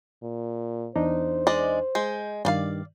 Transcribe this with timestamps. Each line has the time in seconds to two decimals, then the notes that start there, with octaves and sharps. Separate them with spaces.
0.23 A#2
0.96 E2 D4 D#4 C5
1.47 G#3 D5 D#5
1.95 G#3 G6
2.45 G2 D#3 D4 D5 F5